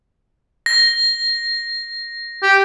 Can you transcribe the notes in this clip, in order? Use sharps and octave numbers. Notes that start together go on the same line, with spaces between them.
A#6
G4